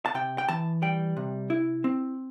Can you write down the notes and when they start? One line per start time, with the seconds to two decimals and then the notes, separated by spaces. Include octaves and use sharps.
0.06 A5
0.14 C3 G5
0.38 G5
0.49 E3 A5
0.82 G3 G5
1.17 C3
1.50 E4
1.84 C4